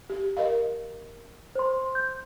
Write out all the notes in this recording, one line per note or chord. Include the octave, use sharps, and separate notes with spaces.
G4
A#4 D#5 F5
C5 C6
G6